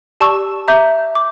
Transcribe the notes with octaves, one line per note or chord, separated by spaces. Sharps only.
G4 D5 A5 C#6 E6
E5 A#5 D6 G6
D6